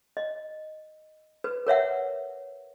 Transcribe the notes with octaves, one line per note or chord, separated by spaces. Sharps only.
D#5
B4
A#4 C#5 E5 F#5